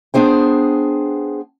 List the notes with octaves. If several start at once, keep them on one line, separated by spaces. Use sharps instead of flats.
B3 D4 G#4 C5 G5